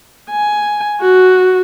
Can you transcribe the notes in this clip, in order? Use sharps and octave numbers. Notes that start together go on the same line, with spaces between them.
G#5
F#4